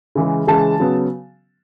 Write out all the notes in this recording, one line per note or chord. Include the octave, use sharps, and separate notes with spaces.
C#3 E3 G#3
C#3 E3 G#3 A5
C#3 F#3 B3